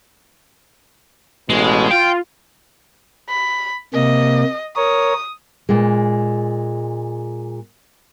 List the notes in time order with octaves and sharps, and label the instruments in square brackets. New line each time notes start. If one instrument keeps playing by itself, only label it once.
[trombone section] A1 B2 [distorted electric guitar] G#3
[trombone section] F4 [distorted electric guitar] G5
[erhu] B5
[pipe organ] C3 A#3 [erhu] D#5
[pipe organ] A#4 C#5 [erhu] D#6
[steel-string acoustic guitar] A#2 G#3